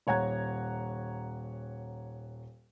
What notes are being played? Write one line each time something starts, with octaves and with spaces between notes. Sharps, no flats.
D#1 C#5 F#5 A#5 G#6